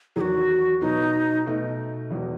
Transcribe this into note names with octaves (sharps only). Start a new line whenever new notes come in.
E2 D#3 F#3 F#4 G#4
B2 F#3 B3 D#4
B2 A3 D#4
E1 E2 B2